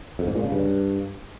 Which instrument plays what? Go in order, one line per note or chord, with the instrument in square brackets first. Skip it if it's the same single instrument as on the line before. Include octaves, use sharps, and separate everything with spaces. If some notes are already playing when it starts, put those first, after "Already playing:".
[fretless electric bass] F2
G#2
A#2
C#3
G2